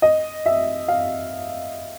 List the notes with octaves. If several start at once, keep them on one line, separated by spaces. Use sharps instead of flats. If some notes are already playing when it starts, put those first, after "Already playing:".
D#5
E5
F5